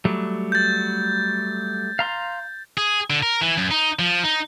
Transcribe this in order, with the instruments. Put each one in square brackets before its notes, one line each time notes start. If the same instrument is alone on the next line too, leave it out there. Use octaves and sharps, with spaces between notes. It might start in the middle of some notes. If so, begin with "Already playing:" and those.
[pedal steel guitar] F#3 G3 A3
[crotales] G6 A6
[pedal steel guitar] F5 A#5 C6
[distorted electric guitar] G#4
D3
A#4
E3
F#2
D#4
F3
D#4